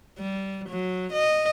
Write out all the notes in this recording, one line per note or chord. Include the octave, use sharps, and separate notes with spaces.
G3
F#3
D#5